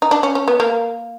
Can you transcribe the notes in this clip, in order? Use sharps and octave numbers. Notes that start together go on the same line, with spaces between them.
D#4
D4
C#4
C#4
B3
A#3